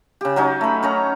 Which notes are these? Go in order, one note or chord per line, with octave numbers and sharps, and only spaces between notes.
C#3 G4
F#3 C#4 D#4
A3 B5
C#4 C#5 A#5